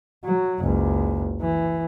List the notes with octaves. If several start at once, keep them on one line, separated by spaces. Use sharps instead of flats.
F#3
F#1 C#2
E3